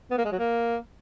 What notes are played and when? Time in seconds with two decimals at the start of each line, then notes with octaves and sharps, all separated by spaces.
0.11 B3
0.18 A#3
0.25 G#3
0.32 F#3
0.39 A#3